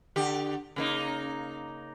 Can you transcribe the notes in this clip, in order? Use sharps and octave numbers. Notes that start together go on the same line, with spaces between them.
D3 G4
C#3 A#3 D#4